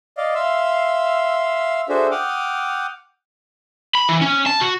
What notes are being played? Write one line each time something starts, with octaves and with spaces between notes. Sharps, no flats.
D5 D#5 F5
E5 F5 C6 E6
D4 F#4 G#4 A4 C5 E5
F#5 G5 D6 D#6 F6
B5
E3
C#4
A5
F#4